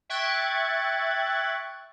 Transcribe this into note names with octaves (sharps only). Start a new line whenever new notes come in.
E5 G5 C#6 F#6 G#6 A6